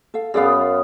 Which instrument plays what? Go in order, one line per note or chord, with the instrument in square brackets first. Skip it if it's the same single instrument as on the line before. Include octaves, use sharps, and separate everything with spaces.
[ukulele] A4 F5
[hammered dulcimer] F#2 B3 [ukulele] G#4 D5 F5